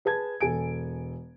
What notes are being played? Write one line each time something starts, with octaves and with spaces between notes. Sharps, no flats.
G#4 B4 A5 G#6
E1 A4 G#5 D7